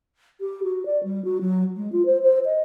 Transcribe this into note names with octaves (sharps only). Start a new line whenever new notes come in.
G4
F#4
D5
G3
F#4
F#3
G#3
F4
C5
C5
D#5